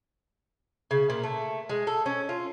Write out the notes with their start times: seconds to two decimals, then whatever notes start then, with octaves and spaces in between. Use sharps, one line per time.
0.91 C#3
1.10 A#2
1.24 A3
1.69 G#3
1.87 A4
2.06 C#4
2.29 F4